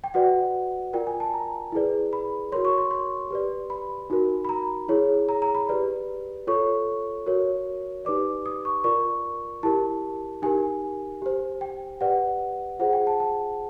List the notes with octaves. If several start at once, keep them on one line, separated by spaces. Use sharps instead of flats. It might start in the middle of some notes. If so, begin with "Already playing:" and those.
G5
F#4 B4 D5 F#5
F4 A#4 D5 G5
G#5
A5
A#5
E4 G#4 B4 D5
B5
F#4 A#4 C#5 C6
C#6
C6
C6
G4 B4 D5
B5
D#4 F#4 A#4
B5
A#5
E4 G#4 C#5
A#5
A#5
B5
G4 B4 D5
F4 A4 C#5 C#6
F#4 A#4 C#5
D#4 G4 B4 D5 D6
D#6
C#6
F4 A#4 D5 C#6
E4 G4 A#4 A5
D#4 G4 A#4 G#5
G4 C5
G5
G4 B4 D5 F#5
F4 G#4 C5 F#5
G5
A5
A5